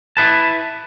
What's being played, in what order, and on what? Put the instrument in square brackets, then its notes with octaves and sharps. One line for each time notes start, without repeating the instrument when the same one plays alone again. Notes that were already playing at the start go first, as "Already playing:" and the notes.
[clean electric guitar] E4 B4 A5